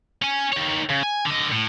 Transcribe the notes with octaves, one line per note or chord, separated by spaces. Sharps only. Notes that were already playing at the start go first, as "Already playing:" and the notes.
C#4 G#5
D#3 C#5
C#3
G#5
D3 D#5
A2